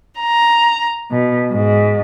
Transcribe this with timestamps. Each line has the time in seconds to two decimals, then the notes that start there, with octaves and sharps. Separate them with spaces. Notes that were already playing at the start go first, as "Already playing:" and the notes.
0.19 A#5
1.10 B2
1.51 G#2